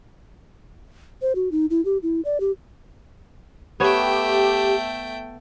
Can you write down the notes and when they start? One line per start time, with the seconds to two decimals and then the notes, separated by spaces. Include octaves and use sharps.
1.22 C5
1.35 F#4
1.52 D#4
1.70 E4
1.85 G4
2.03 E4
2.25 D5
2.40 G4
3.80 A3 B3 G4 C#5 G5